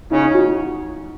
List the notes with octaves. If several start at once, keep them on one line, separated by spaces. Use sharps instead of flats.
C#3 C#4 D#4
F#4